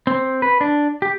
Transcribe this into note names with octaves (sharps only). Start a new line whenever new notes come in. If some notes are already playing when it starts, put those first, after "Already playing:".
C4
B4
D4
G4